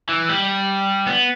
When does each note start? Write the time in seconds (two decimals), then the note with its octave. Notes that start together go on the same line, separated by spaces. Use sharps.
0.09 E3
0.29 G3
1.07 B3